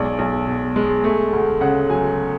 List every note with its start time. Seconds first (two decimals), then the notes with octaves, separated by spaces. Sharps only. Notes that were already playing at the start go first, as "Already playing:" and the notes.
Already playing: B1 G#3 D5
0.19 B1
0.47 B2
0.76 G#3
1.04 A3
1.33 D2
1.61 C#3 F#5
1.90 F#3 G#5